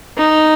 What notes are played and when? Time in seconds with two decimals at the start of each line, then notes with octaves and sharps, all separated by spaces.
0.17 D#4